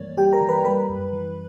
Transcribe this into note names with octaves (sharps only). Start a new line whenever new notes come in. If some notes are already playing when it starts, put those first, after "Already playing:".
Already playing: G2 E3 G3 A#3 C#5 D5
G3 G4 G5
A#4 A#5
E3
B4 B5
G3 B4 B5
F#2
E3